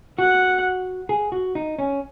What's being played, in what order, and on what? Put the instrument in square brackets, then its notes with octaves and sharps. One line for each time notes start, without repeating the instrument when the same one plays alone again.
[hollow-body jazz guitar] F#4 [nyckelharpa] F#5
[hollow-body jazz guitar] G#4
F#4
D#4
C#4